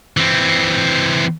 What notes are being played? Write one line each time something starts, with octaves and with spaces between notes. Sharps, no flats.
E3 C4